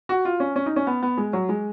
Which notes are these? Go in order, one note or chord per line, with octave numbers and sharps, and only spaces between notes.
F#4
F4
C#4
C#4
D#4
C#4
B3
B3
G#3
F#3
G#3